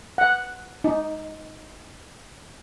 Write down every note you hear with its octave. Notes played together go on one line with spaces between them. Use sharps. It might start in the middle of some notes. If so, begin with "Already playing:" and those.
F#5
D#4